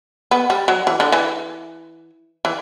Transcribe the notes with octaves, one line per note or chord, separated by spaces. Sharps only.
B3
G3
F#3
E3
D3
E3
E3